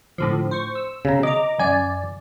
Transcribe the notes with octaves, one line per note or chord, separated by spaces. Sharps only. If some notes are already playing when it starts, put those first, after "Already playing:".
A2 D3 F3
C5 C#6
E6
C#3 A#5
D#5 A#5 D6
F#2 D5 G#5